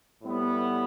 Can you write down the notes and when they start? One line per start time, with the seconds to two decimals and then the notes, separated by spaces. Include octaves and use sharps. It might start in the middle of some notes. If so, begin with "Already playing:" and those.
0.23 A2 G3 B3